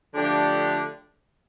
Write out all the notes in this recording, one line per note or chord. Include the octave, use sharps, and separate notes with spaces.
D3 F3 A3 D4 G4